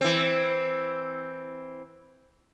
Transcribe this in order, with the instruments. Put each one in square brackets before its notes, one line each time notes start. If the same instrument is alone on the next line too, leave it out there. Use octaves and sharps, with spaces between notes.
[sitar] E3 C4